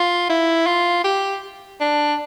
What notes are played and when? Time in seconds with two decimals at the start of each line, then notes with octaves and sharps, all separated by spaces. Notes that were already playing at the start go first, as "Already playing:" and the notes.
Already playing: F4
0.29 E4
0.67 F4
1.04 G4
1.81 D4